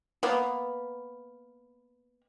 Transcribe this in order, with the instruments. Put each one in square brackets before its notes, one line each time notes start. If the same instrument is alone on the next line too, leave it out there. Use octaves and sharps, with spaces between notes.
[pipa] A#3 B3